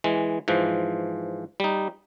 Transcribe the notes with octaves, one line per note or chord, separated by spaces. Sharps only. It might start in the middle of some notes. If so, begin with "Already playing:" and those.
E3 G#3
G#2 E3 F3
G3 D#4